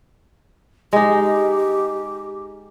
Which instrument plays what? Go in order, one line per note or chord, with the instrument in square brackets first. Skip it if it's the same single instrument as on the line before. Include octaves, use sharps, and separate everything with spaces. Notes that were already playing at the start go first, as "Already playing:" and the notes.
[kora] G#3 D#4 [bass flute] G4